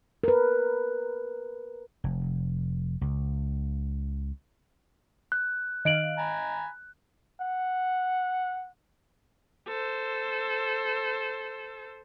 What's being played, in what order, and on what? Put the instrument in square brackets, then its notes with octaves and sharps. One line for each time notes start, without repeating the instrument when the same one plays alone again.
[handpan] A#4 B4
[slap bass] F1
C#2
[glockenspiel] F#6
[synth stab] D#3 F5 [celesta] D#5 D7 F#7
[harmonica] G#5 A#5 B5
[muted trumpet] F#5
[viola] A4 C5